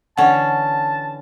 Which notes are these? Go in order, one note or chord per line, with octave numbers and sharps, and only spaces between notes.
D3 E3 C#4 F#5 A5